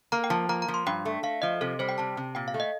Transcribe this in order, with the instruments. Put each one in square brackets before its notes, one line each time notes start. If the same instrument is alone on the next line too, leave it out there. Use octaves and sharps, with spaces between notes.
[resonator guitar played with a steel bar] A#3 [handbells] A#5
[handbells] G5
[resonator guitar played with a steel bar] F3 [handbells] A5
[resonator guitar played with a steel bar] A#3 [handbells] A#5
[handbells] A#5
[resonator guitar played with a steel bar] F3
[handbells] C6
[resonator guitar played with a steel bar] G2 [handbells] G5
[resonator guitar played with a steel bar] A3
[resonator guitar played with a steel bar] A3 [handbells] F5
[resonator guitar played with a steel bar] F3 [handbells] D#5
[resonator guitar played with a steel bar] C3 [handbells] A4
[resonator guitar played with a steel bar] G3 [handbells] C5
[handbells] G5
[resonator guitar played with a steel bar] C3 [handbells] A5
[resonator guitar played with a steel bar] C3
[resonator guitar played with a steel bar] A#2 [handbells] G5
[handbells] F5
[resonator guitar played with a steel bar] A3
[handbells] D#5